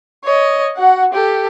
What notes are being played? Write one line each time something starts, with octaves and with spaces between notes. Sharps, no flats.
C#5 D#5
F#4 F#5
G4 A4